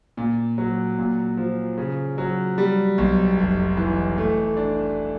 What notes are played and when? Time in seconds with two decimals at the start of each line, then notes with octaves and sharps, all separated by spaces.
0.17 A#2
0.58 F#3
0.98 A#2
1.37 F3
1.77 C#3
2.18 F#3
2.58 G3
2.98 B1
3.38 F1
3.77 E3
4.18 A3
4.57 D4